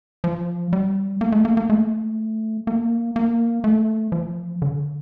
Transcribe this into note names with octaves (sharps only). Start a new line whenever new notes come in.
F3
G3
A#3
A3
A#3
A#3
A3
A#3
A#3
A3
F3
D3